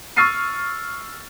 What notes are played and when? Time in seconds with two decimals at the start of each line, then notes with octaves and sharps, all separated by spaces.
0.16 C#6 E6 F6 A6 C7 D#7